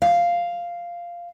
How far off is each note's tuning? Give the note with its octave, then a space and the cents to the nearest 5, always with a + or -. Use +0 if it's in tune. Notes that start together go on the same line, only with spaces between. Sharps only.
F5 -5